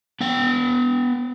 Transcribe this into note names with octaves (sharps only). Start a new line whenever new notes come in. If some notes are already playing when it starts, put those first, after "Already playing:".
B3 G5